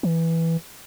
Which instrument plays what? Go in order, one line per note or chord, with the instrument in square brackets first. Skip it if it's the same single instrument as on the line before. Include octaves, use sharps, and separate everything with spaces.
[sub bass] E3